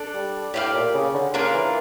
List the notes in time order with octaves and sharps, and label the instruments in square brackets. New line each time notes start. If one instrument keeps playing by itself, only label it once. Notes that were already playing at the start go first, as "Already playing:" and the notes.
Already playing: [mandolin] D4 A4 D5
[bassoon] G3
[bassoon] A2 [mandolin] G4 D5 F5
[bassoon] A#2
C#3
D3
[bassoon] C#3 [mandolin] A#3 D4 F4 A#4
[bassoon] E3